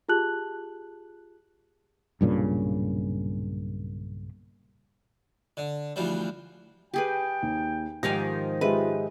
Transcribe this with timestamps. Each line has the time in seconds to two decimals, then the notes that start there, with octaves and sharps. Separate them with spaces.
0.09 F4 G4 G#4 A5 F#6 F#7
2.21 B1 G2 A#2 C#3
5.57 D3
5.96 D2 E3 F3 G3
6.94 G4 G#4 B4 G5
7.42 D#2
8.03 G#2 D#3 F3 G4 F5 G#5 A#6
8.61 G#3 F4 G4 B4 E5